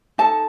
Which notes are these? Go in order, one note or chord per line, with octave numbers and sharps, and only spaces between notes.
D#4 A4 A5